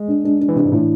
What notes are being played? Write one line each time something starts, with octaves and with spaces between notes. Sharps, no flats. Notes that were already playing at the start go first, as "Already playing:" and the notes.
Already playing: G#3
D4
D4
D4
E3
C3 D4
G#2
A2 E3